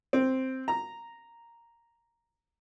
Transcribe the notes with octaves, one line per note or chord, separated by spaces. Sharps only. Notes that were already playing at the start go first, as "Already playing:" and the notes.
C4
A#5